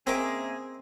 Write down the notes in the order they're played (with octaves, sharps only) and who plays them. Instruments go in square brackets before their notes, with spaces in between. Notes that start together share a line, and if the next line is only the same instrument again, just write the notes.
[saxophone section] C#3 G#3 G#4 [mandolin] A#3 E5 D6 [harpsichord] C4